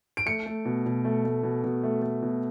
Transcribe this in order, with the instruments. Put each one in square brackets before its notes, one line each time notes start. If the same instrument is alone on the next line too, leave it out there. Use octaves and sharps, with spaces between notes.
[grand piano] D7
A3 C#7
A3
B2
B2
A3
A3
B2
B2
A3
A3
B2